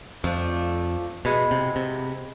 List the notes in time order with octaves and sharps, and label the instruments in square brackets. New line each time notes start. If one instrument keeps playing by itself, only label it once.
[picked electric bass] F2 [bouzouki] F3 A3 D4
[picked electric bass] B2 [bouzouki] E3 G#3 B3
[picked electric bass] C3
C3